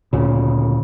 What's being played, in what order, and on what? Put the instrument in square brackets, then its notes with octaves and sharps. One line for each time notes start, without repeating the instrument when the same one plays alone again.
[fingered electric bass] D2 A#2 C#3